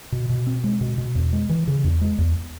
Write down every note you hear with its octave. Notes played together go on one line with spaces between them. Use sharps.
B2
B2
C4
G#3
B2
B2
E2
G#3
E3
C#3
E2
G#3
E2